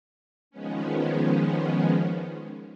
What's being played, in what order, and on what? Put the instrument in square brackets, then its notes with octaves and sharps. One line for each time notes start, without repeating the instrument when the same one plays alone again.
[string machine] D#3 F3 G#3 B3 C#4